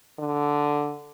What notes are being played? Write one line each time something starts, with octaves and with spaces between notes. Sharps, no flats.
D3